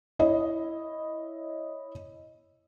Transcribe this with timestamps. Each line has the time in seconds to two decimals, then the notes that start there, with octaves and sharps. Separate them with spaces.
0.19 E4 C#5 D#5